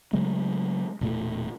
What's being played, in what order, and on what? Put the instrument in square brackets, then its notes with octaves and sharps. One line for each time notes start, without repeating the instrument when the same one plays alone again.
[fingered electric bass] C#3 F#3 G#3 A3
E1 A#2 A3